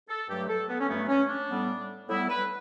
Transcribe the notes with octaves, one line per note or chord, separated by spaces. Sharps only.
A4
G2 F#3 A3 G4
A4
B3
C#4
G2 F#3 A3 B3
C#4
D4
A2 G3 B3
A2 G3 B3 E4
B4